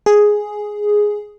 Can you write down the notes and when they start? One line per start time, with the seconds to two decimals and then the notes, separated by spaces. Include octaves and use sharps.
0.06 G#4